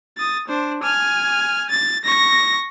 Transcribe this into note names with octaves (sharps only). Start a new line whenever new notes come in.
D#6 A6
D4 C5
G#5 F6
A6
C#6 A#6